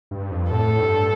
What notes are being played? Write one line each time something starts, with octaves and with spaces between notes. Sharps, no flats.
G2
F2
A2 A4
G2